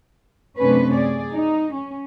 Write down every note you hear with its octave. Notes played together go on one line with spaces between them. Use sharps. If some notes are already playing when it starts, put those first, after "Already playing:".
F#2 C3 A3 C#4 D4 B4
G#4 D5
D#4
C#4